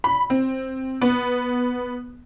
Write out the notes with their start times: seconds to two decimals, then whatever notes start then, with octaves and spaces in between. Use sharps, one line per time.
0.04 B5
0.30 C4
1.01 B3